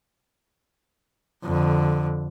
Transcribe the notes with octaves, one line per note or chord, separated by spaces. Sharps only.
F2 D3